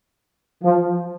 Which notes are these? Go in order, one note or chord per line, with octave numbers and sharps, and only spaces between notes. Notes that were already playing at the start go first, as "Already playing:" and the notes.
F3